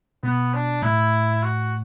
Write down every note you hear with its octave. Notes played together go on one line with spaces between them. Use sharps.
B2 B3
D4
A2 E4
F#4